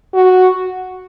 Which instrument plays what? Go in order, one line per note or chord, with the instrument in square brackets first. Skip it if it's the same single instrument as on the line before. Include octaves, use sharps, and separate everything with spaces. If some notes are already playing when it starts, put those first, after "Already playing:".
[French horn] F#4